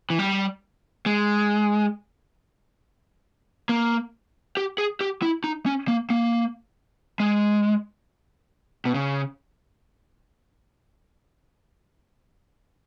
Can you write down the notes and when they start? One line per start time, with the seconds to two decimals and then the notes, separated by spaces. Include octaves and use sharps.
0.10 E3
0.19 G3
1.06 G#3
3.69 A#3
4.57 G4
4.78 G#4
5.01 G4
5.22 E4
5.44 D#4
5.66 C#4
5.88 A#3
6.10 A#3
7.20 G#3
8.85 B2
8.95 C#3